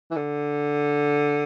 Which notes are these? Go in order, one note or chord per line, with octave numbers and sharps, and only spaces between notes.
E3
D3